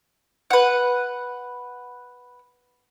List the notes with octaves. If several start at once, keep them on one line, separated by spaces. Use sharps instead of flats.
B4 F#5